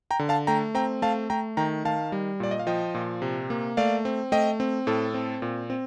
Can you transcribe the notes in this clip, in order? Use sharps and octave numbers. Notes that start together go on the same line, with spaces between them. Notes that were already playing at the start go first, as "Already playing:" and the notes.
G5 A#5
D3
F5 A5
A3 G5 A#5
C4 G5 A#5
A3 F5 A5
A3 G5 A#5
D#3 G5 A#5
D#3 F5 A5
G3
A#2 D5
D#5
F5
F3 D#5 G5
A#2
C3
A#3
A3 D5 F5
C4
A3 D#5 G5
C4
A2 A4
C4
A#2
C4